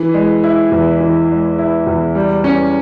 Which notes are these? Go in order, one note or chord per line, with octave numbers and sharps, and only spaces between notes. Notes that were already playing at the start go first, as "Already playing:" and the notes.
Already playing: E3
G#3
E4
E2
E3
G#3
E4
E2
G3
C#4